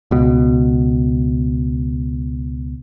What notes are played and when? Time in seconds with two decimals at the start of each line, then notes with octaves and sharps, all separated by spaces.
0.11 C#2 B2